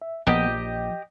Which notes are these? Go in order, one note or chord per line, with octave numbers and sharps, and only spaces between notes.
E5
A#1 B3 G4 D#5 F#5
F3